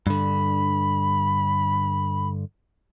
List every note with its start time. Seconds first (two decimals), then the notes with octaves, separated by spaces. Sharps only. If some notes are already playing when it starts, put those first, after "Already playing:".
0.07 G2 D3 B5